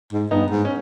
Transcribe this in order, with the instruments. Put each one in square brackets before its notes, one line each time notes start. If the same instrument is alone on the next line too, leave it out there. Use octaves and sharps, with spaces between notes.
[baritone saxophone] G#2
[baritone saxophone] G2 [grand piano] B3 D#4
[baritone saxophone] G#2
[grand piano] C#4